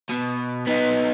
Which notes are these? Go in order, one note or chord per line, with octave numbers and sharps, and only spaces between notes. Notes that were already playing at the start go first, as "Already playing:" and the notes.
B2
B3 D#4